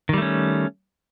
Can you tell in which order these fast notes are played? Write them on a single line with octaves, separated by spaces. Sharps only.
D#3 G3 A3 C#4